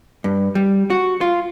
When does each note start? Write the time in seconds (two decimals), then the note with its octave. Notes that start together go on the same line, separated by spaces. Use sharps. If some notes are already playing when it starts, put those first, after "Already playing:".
0.24 G2
0.55 G3
0.90 F#4
1.21 F4